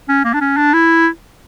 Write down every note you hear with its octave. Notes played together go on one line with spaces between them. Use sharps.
C#4
A#3
D4
C#4
D4
E4